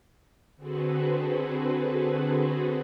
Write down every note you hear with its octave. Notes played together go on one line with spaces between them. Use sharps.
D3 C4 F#4 G#4 A4 B4